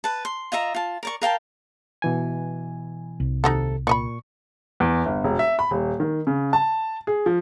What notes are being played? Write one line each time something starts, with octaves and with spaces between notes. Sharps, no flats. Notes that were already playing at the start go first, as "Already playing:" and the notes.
B4 A5
C6
F4 D#5 E5 A#5
F4 A5
A#4 D5 C#6
A#4 F5 G5 A5
B2 E3 G#5
C2
D#2 C3 D#4 F#4 A4 F#5
A#2 D5 D#5 B5 C#6
E2
G1
E1
E5
B5
D#1
D#3
C#3
A5
G#4
F3